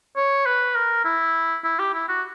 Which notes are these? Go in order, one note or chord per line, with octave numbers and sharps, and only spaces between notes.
C#5
B4
A#4
E4
E4
G4
E4
F#4